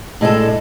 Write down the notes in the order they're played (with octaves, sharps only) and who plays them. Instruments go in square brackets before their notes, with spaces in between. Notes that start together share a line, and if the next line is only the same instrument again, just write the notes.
[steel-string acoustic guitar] A2 G#3 D4 A4